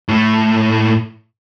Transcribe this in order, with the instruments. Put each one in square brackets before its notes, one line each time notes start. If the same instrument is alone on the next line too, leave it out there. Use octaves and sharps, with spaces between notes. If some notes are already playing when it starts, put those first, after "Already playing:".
[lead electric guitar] A2 A3